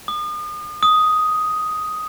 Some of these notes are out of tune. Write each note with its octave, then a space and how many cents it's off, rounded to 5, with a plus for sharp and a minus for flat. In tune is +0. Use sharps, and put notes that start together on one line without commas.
D#6 -40
D#6 +5